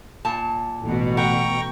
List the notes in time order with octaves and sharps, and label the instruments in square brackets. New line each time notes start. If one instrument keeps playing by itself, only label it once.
[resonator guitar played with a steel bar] A#2 A5
[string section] A1 B2
[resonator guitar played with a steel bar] F#5 [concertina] G5 A#5 C#6